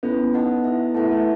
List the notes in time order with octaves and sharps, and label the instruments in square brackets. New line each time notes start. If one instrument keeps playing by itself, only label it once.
[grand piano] B3 [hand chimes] C#4 E4 A4
[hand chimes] D#4 A4 D#5 F#5 A5
E4 A4 E5
[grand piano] A3 [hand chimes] E4 B4 F#5 A5
[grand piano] A3